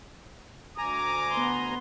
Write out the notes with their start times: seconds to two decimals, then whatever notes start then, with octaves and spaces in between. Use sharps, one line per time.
0.78 D2 G#5 A#5 D6
1.31 B3 C6